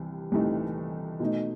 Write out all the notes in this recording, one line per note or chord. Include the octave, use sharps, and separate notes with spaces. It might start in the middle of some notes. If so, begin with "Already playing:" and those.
Already playing: C2 C3 E3
C2 C3 E3 A3 D#4
B2 A3 D#4